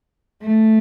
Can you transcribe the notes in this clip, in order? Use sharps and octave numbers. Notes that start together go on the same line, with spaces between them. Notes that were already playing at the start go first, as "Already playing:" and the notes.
A3